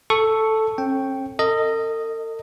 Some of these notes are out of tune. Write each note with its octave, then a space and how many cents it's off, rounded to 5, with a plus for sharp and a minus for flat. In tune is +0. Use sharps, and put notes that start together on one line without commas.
A4 +0 C#6 +0
C#4 -45 G5 +0
A4 +45 D#5 +0